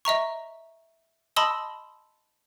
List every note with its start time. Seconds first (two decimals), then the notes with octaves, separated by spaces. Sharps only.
0.05 D#5 E5 A#5 C#6
1.36 D#5 A5 B5 C6 D#6 E6